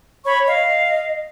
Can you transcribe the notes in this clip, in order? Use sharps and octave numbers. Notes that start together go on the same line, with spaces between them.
C#5 B5 C#6
D#5 F5